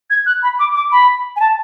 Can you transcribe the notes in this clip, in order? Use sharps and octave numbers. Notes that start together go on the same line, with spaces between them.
G#6
F#6
B5
D6
D6
B5
G#5
A5